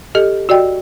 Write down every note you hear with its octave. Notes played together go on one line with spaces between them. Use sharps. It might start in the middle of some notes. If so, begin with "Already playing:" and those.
G4 A4 D#5
F#4 D5 D#5 G5